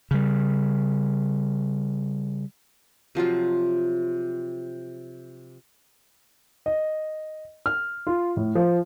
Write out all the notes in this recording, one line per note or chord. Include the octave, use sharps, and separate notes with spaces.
C#3 G3
C3 F3 F#3 F4
D#5
F6
F4
A2
F3